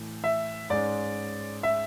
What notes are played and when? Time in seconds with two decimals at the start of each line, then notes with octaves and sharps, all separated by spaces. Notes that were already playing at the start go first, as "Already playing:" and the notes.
Already playing: A2 E3
0.24 E5
0.70 G#2 G#3 C#4 D5
1.63 E5